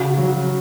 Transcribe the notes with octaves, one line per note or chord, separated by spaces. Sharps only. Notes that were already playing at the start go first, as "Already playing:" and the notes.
Already playing: C#3 F#4
F#3